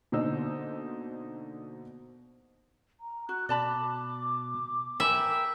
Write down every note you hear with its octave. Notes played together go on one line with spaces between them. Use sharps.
B2 D3 A#3 D#4 C5 E6
A#5
F#4 F#6
B2 D5 A5 B5 D6
A#4 E5 G5 G#5 B5